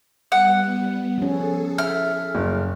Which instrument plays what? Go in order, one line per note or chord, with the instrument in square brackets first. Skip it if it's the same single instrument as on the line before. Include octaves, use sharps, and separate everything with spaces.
[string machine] G3 B3 [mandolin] F#5
[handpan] F3 C#4 [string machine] G#4 A4
[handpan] E5 [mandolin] F6
[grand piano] F#1